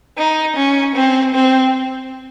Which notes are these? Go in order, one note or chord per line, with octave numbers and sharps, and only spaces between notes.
D#4
C#4
C4
C4